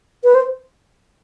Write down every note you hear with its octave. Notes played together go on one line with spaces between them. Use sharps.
B4
C5